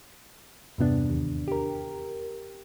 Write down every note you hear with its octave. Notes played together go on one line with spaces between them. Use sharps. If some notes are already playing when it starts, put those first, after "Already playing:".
E2 G2 C3 B3 D4
D#2
G4 A#4